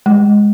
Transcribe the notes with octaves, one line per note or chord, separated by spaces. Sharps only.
G#3